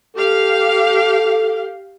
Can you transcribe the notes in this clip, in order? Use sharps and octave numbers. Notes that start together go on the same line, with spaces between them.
G4 A4 F5